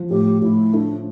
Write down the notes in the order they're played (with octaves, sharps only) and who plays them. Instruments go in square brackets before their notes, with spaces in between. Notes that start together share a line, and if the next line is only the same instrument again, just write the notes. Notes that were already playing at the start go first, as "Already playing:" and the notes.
Already playing: [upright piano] F3
[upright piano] A2 [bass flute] G4
[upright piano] A2 [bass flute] E4
[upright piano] A3 [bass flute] D4